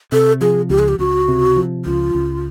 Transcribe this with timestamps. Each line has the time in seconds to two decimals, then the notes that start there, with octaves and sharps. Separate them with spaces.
0.12 C3 A4
0.41 F3 G#4
0.70 C#2 G4
0.79 G#4
0.88 G4
0.99 C#2 F#4
1.28 C3
1.57 F3
1.85 C#2 F4
2.15 C#2